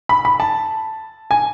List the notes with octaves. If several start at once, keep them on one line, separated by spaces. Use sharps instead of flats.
B5
B5
A5
G#5